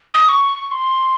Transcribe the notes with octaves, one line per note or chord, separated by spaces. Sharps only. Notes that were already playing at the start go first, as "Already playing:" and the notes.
D#6
C#6
C6